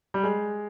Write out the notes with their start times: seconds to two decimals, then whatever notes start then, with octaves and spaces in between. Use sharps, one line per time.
0.14 G3
0.23 G#3